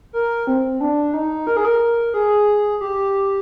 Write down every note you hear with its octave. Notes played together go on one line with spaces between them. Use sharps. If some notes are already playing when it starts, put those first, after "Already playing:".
A#4
C4
D4
D#4
A#4
G#4
A#4
G#4
G4